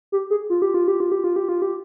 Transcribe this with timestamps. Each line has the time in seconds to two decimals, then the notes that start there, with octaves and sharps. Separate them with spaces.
0.12 G4
0.30 G#4
0.50 F4
0.62 G4
0.74 F4
0.88 G4
1.00 F4
1.12 G4
1.24 F4
1.36 G4
1.49 F4
1.62 G4